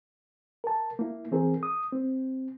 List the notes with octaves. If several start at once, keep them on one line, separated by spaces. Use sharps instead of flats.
A#4 A5
A#3 E4
E3 C4 G#4 A#4
D#6
C4